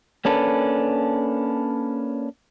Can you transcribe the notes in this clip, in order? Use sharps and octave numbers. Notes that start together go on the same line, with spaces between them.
A#3 C#4 D4 A4 B4